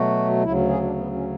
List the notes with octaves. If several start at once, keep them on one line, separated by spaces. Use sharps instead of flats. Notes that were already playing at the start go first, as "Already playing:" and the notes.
Already playing: B2 F#3 A3 F#4
D2 C#3 F#3 E4
G#4
D4
B3
C#4